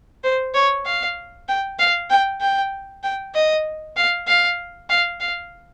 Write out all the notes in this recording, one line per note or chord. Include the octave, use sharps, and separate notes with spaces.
C5
C#5
F5
G5
F5
G5
G5
G5
D#5
F5
F5
F5
F5